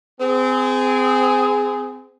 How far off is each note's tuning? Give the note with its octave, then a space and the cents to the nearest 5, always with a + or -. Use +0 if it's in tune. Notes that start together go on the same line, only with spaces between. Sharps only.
C4 -30 G#4 +0